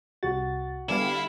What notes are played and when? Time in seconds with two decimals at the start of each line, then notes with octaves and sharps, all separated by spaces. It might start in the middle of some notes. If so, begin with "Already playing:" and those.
0.23 C2 F#4 A6
0.89 D3 G3 B3 E4 D5 F5 G#5